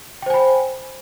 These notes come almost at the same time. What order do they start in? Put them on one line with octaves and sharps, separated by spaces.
G5 C5 G#5 B5